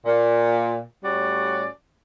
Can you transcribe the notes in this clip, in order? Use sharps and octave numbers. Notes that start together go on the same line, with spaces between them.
A#2
A2 G3 C#4 F#4 D5